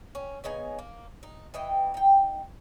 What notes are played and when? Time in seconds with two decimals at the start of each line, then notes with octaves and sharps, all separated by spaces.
0.15 C#4
0.44 C#3 B3 D#4 G#5
0.79 A#3
1.23 D#4
1.54 E3 D#5 G5
1.94 D#4 G5